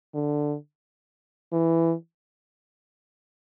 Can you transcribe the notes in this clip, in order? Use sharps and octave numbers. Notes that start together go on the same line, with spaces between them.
D3
E3